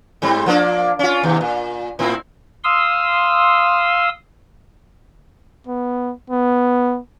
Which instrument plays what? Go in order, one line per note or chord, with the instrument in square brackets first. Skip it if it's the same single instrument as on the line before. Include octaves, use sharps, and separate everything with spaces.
[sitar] G#2 G3 C4
F3 A#3 D4
C#4 F4
D#2 C3
A#2
A2 C4 E4
[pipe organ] F5 C6 D#6 E6
[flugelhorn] B3
B3